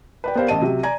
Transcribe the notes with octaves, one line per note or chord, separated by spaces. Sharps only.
B4 D5 G5
B3 G4 A#4 C5 D5 F5
A1 D#5 A5 D#7
C3 F#3
D5 G#5 A#5 G#6